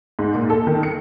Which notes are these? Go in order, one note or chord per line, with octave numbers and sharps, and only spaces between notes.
G#2
A#2
A4
D#3
C#7